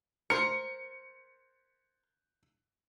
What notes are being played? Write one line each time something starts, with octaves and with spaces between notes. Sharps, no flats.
A#4 C5 C#7